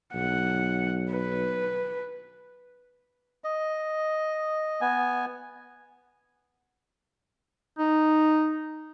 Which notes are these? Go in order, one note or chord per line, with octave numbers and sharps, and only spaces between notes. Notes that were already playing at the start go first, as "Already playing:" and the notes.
B1 F#5
B4
D#5
B3 G#5
D#4